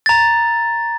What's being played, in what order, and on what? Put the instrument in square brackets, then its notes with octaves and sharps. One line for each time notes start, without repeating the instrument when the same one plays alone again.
[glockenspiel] A#5 A6